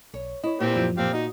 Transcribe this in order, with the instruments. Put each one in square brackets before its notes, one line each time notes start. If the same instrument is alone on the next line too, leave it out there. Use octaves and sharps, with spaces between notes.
[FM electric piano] B1 [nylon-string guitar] C#5
[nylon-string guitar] E4 [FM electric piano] C#5 D#5
[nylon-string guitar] A#2 [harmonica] E3 C4 G4
[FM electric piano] F#2 F3
[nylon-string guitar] A#2 [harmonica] C4 G4 F5
[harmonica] D#4 [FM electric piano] F#4 D#5